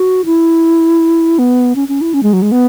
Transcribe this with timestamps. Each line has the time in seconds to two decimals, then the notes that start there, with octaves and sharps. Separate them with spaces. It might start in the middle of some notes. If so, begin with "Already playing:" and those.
Already playing: F#4
0.25 E4
1.39 B3
1.75 C#4
1.88 C#4
2.01 E4
2.14 C#4
2.23 G#3
2.33 F#3
2.42 G#3
2.52 B3